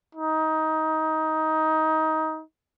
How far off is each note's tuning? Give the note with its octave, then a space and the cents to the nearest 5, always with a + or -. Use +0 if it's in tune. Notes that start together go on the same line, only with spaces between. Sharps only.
D#4 +20